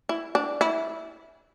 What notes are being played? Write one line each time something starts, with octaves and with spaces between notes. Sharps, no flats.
E4
D4
E4